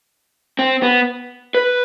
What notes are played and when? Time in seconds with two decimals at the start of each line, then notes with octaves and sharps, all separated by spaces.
0.59 C4
0.83 B3
1.55 B4